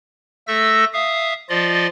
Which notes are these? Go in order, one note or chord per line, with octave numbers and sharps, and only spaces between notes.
A3 A4 E5 E6 A#6
E5 F5 D#6
F3 F4 D5 D#5